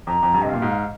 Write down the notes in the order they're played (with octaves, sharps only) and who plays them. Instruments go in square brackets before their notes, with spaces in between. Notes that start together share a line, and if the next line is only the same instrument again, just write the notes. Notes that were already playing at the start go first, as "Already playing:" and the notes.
[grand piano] F2 [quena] A#5
[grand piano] F2
G2
[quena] D#5
[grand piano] C3
[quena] F5
[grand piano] A#2
G#2